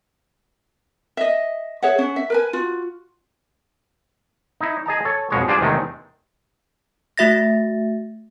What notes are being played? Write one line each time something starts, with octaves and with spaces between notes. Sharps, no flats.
D#5 E5
G#4 C#5 E5 F#5
C#4 F#5
E5
A#4 B4 G#5
F4 F#4
D#4 E4
G#4 D#5 A5 A#5
A4 C#5
F2 B2 G#3 C#5
G3 D4 F4 G#4 C5 D5
E2 C3 D#3 G#3 A3 C4
A3 F#4 E5 A6 A#6